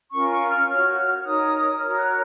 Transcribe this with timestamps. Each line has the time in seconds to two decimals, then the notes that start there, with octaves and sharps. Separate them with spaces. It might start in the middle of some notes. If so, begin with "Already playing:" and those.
0.12 C#4 F4 A#4 C#6
0.30 C#6
0.49 F6
0.67 F#4 C#5 F6
1.11 F6
1.23 D#4 A#4 C#5 D#6
1.70 D#6
1.78 F#4 A#4 C#5 F6
1.97 F#6